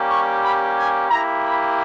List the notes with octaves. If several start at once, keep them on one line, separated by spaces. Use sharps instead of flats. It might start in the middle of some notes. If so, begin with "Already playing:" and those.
Already playing: G3 A#3 C#4 G4
C#6
B5
G#5
A#3 E4 G4 A#5
B5